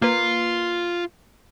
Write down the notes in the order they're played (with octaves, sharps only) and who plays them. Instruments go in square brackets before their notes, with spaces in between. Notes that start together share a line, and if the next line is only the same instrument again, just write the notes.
[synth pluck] A#3 B4 [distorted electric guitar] F4